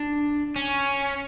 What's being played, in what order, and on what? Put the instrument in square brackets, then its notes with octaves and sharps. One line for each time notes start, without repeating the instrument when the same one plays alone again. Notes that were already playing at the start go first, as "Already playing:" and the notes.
Already playing: [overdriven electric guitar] D4
C#4